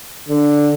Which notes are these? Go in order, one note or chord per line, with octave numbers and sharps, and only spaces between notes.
D3